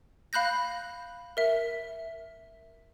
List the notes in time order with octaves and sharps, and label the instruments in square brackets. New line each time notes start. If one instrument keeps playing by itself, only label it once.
[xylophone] F5 B5 F#6 G6 A#6
A#4 E5